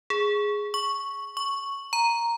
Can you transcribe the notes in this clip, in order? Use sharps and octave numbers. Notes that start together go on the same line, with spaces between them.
G#4
C#6
C#6
A#5